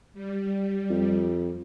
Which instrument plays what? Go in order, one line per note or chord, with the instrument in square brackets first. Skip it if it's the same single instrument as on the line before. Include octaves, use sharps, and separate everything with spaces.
[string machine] G3
[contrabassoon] F2